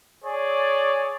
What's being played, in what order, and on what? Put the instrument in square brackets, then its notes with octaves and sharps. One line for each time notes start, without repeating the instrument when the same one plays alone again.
[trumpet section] G#4 C#5 D5